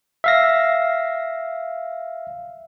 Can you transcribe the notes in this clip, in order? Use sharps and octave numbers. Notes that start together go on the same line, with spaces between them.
E5 F5 A#6